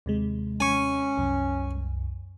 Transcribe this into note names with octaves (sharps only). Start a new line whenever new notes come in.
D#2 C3 G#3
C#4 G#5 C#6
C2 F#2